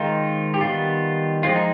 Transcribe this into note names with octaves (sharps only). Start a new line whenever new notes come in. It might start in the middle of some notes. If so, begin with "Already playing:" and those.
Already playing: D#3 G#3 C4 D#4 F4
G4
D#3 G3 B3 F4
F3 G#3 C4 F4
D#4